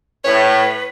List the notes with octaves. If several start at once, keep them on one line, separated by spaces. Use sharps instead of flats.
A2 B4 C#5